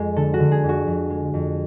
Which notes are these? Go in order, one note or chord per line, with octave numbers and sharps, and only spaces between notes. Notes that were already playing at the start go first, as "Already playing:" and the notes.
Already playing: F2 G#3
D3 A4
F#4
D3
G#4
F2
F#4
F2
G#3
F2